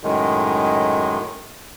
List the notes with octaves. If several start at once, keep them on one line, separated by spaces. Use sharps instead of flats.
F#2 A2 D#3 G#3